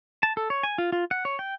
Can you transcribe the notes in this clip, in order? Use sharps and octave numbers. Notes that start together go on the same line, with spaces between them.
A5
A4
C#5
G#5
F4
F4
F#5
C#5
G5